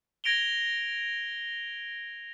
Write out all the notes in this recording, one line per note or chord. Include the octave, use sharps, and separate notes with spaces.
G#6 A#6 D7 F7 G7